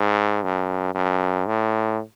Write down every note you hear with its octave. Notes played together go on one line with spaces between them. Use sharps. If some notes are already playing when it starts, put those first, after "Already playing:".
Already playing: G#2
F#2
F#2
A2